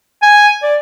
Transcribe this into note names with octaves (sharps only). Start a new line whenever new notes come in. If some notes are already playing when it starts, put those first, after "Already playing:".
G#5
D5